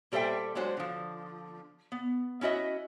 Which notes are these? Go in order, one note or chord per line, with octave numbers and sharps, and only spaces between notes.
A#2 G3 A4 C5 E5 G5
F#3 G#3 D4 F#4 C5
D3 F3
B3
C#4 E4 F#4 D#5 E5